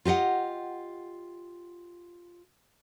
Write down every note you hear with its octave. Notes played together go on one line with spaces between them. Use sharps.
F4 G4 D#5 F#5